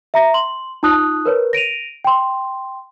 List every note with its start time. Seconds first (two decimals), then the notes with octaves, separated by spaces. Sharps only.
0.14 E5 A#5 A#6
0.34 C6 F#7
0.83 D#4 F4 A5 D#6 F#6
1.25 A#4 B4 C#5
1.53 A#6 D7 D#7 F7
2.04 G5 C6